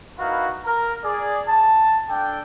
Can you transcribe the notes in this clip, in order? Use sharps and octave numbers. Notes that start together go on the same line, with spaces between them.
D#4 E4 F#4 A#4 B4 F5
A#4
G#4 D5
A5
D4 A4 G5